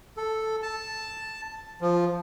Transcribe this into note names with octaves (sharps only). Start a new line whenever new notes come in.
A4
A5
F3